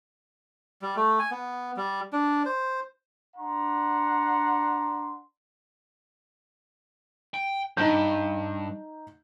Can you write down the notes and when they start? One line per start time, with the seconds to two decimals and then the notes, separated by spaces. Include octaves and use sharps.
0.82 G3
0.96 A3
1.19 G#5
1.31 B3
1.77 G3
2.13 D4
2.46 C5
3.36 D4 F#5 A#5 C6
7.34 G5
7.77 G2 D#4 G6